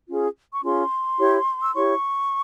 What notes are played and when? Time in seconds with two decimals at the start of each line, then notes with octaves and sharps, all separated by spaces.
0.07 C#4 F4 G#4
0.52 C#6
0.63 C#4 F4 G#4 C6
1.18 E4 G4 C#5
1.63 E6
1.74 E4 G4 C#5 C#6